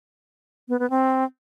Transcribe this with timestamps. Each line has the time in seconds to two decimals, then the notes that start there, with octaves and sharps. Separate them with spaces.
0.69 B3
0.79 B3
0.90 C4